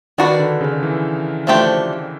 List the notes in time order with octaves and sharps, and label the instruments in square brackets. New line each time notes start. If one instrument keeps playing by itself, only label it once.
[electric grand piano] D#3 [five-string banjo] D4 F#4 B4 D5
[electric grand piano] D3
C#3
E3
[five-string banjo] F3 A3 D4 G4 C5